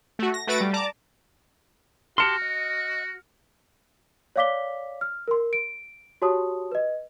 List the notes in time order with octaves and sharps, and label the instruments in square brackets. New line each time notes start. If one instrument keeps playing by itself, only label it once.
[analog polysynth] A3 F#4
A#6
A3 F#4 B4 A6 A#6 D7
G3
D5 A5 A#5 D6
[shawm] F#4 [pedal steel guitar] G4 A5 C6 [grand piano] F6 C#7
[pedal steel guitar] D#5
[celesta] C#5 D5 F5 D6 B6 G7
F6
A#4 C6
D7
F#4 G4 C#5 A5 C6 D#6
B4 D#5